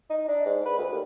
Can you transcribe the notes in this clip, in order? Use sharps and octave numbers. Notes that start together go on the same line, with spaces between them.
D#4
D4
G#2
B4
D2
D#2